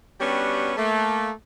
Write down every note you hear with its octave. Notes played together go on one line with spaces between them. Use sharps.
G3 B3 C#4 D4 F#4 G4
A3 A#3